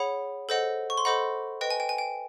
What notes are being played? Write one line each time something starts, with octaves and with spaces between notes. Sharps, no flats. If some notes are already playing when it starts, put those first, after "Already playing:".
Already playing: G#4 C#5 F#5 B5
A4 C5 D#5 F#5
C#6
C6
A4 C5 D#5 F#5 B5
B4 D#5 G5
G#5
G5
G#5
G5